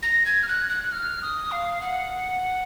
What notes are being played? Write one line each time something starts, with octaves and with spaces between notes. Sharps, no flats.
A#6
G#6
F6
F#6
F#6
F#6
F6
D#6
F5
F#5